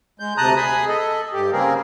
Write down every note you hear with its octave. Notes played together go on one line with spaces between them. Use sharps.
G#3 G6
D2 C3 A5 A#5 D#6 F#6
G#4 G#5 B5 D#6
A4 D#5
G2 G4
C#3 A#3 C4 G#4 A#4